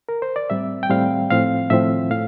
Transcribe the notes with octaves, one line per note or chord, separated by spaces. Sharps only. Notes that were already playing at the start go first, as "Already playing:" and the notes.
A#4
C5
D5
A2 G3 C4 E5
G5
A2 G3 C4 F5
A2 F3 C4 F5
A2 F3 C4 E5
A2 F5